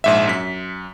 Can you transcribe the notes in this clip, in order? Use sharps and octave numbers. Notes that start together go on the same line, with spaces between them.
A#1 G#2 E5
F#2 B6